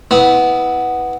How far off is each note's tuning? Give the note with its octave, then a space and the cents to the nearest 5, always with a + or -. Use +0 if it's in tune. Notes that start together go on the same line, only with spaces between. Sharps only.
B3 +0 E4 -25